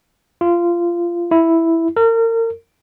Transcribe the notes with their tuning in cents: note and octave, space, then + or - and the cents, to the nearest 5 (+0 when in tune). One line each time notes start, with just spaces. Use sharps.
F4 -20
E4 +0
A#4 -35